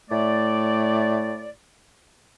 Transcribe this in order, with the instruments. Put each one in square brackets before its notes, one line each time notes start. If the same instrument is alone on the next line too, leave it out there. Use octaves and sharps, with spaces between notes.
[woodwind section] A2 A3 D5